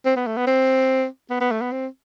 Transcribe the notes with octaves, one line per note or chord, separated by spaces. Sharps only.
C4
B3
A3
B3
C4
B3
B3
A3
B3
C4